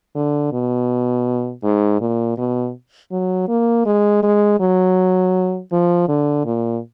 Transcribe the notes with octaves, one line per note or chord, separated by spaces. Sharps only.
D3
B2
G#2
A#2
B2
F#3
A#3
G#3
G#3
F#3
F3
D3
A#2